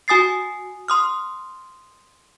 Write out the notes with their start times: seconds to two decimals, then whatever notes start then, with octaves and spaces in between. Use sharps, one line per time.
0.08 F#4 G#5 D#6 A6 C7
0.88 C6 D#6 F6